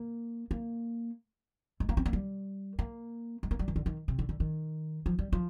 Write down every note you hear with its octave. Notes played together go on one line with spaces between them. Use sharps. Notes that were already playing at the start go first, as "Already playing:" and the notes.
Already playing: A#3
A#3
G#3
A#3
C4
A#3
G3
A#3
G#3
A#3
G3
D#3
D3
D#3
C3
D3
D3
D#3
F3
G3
F3